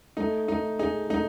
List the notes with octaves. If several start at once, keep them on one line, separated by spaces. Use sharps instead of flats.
A3 D#4
A3 D#4
D#4 G#4
A3 D#4